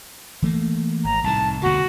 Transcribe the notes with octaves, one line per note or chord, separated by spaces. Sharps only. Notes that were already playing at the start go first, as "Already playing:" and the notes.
E3 A3 A#3
G#1 A#5
C2 A2 D#3 A5
D2 B2 D3 F#4